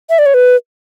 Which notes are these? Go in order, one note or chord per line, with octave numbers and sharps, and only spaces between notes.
E5
D5
C#5
B4